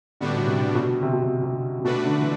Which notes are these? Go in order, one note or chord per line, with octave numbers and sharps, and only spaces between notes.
A2 D3 G3 B3 D4 F#4
B2
C3
B2
C3
B2
C3
C3
C3
B2 A3 D4 F#4 B4
D3
E3